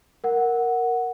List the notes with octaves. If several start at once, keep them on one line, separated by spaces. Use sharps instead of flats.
A#4 F#5